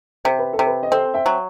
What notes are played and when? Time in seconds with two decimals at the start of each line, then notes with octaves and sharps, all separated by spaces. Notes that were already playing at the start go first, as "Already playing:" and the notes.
0.25 C3 C5
0.39 B4
0.53 A4
0.59 C3
0.66 B4
0.83 D#5
0.92 C4 A4 C5
1.14 E5 G5
1.26 F#3